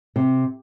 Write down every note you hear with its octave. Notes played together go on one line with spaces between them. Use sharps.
C3